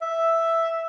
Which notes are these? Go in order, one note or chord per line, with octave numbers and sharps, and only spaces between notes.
E5